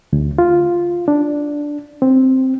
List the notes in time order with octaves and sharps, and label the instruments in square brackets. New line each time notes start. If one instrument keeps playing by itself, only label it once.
[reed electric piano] D2
F4
D4
C4